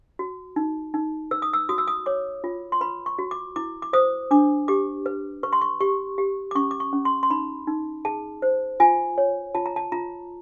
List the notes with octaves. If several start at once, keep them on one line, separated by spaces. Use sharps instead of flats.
F#4
D#4
D#4
B4 E6
D#6
E6
F#4 D#6
E6
D#6
C#5 D6
F4
C6
B4 B5
C#6
F#4
D6
E4 D6
D6
C5 D#6
D4 D6
G4 D6
B4
B4 C#6
C6
C#6
G4 C#6
G4
D6
C#4 C#6
D6
C#6
C#4
C6
C6
D#4 B5
D#4
G#4 A5
C5
F4 G#5
C#5
F4 A5
A#5
A5
F4 A#5